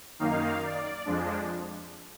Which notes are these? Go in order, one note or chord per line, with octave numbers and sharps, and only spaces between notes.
F#2 D#3 A#3 D#4 F5
D5
F2 F3 G#3 D4